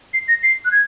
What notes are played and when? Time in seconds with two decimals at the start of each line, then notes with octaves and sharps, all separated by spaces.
0.13 C7
0.28 A#6
0.43 C7
0.65 F#6
0.72 G#6